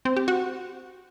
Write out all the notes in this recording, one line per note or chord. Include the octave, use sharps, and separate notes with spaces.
C4
G4
F#4